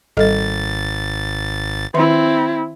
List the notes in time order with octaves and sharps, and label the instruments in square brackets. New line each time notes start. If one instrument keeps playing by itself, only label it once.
[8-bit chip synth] G#1 A6 [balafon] G3 A4 D#5
[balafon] D#3 E5 C6 [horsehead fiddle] C4 E4